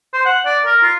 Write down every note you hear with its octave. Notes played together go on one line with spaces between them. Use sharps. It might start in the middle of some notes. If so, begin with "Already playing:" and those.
C5
F#5
D5
A#4
F4